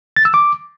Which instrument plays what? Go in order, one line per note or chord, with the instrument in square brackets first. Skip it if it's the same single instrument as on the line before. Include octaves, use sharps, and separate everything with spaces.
[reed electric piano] A6
E6
D6